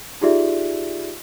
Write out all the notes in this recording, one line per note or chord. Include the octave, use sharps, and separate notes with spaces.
D#4 F4 G4 G#4 D5 E5